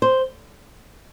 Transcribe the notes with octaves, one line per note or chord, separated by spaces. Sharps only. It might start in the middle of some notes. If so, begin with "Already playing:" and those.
C5